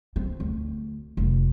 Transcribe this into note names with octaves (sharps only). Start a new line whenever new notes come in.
C4
D2
F1